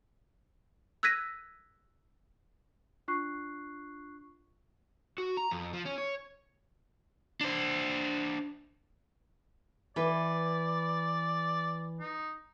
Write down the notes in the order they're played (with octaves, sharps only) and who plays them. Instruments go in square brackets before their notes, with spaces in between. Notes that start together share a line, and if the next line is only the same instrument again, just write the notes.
[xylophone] E6 F#6 G#6 A#6 B6 D#7
[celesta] D4 F4 C#6 F#6 C7
[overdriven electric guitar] F#4
A#5
F2
F3
C#4
C#5
D4 C5
[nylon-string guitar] E3 B4 [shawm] D5
[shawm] D#4